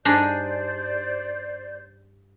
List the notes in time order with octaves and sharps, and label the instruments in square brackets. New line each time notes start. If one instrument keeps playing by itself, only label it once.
[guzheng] G2 [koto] D4 D#4 G#4 [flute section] C5 D5 G6